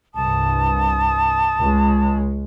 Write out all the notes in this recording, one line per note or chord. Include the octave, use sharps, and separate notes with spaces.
C2 G2 A5 D#6
C#2 G#3